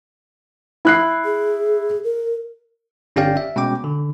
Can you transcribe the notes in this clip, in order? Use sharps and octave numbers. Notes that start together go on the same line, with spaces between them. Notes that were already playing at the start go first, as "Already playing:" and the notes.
E4 F#6 C7
G#4
A#4
G1 C#4 G4 D5 F5 G5
E5
B2 G#3 C#4 G5 D6
D3